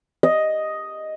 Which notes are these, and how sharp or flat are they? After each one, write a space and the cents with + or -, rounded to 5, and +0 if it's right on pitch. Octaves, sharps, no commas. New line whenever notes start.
D#5 +5